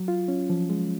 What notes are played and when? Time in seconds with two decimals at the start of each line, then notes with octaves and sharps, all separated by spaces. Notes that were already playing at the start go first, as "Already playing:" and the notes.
Already playing: F#3
0.08 F4
0.28 C#4
0.50 F3
0.70 G#3